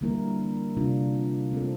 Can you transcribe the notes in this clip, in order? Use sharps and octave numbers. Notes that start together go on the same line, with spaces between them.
D3 G3 A#3 E4 A#4
C3 G3 D4 F4
A3 C4 F4 A4